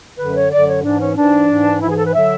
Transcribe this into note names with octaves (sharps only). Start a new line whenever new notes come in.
F#2 D3 F#3 B4
C#5
F#2 D3 F#3 D5
C#5
G#2 E3 D4
C#4
G#2 E3 D4
G#2 E3
G#2 E3 E4
G#4
A4
B4
D3 F#3 E5